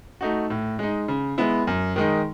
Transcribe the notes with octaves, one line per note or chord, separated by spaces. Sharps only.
A3 D#4 F#4
A2
G#3 D#4
C#3
G#3 B3 E4
F#2
D#3 G#3 D#4